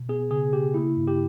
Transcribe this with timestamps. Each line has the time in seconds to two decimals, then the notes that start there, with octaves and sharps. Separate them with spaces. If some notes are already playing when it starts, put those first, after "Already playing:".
Already playing: B2
0.09 B3 G#4
0.30 C#3 G#4
0.53 C#3 G4
0.74 A#3 E4
0.97 G2
1.08 G4